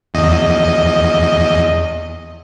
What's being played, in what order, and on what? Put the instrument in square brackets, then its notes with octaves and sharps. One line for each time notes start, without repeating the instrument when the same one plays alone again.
[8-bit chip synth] E2 D#5